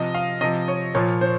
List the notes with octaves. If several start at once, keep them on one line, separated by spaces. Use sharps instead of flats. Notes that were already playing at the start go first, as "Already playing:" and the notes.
Already playing: C3 F3 D#5
F5
C3 F3 D#5
C#5
A#2 F3 C#5
C5